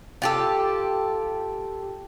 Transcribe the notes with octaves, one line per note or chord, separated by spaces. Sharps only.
F4 G4 A4